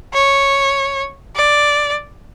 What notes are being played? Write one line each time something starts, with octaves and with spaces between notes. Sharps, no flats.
C#5
D5